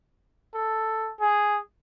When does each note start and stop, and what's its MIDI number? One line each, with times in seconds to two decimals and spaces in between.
0.55 1.11 69
1.20 1.58 68